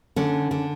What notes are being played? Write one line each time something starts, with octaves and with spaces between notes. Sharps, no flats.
D3 C#4
D3